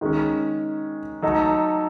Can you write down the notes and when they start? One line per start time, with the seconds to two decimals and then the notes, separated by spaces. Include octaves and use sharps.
0.01 D#3 G#3 C#4
1.22 F#3 A3 D#4 A4